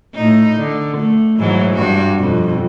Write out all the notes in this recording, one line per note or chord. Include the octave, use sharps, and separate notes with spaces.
A2 D#4
D3
A3
G#2 E3 F#3
G2 F#4
F2 B2